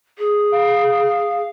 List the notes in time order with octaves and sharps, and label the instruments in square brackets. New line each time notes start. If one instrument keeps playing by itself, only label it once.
[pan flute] G#4
[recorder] F5